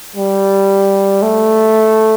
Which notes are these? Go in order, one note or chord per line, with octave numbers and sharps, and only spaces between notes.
G3
A3